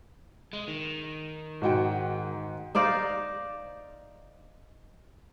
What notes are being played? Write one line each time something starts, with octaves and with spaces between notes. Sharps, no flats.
G#3
D#3
G#2 F#4 G5
D#4 C5 D5 F5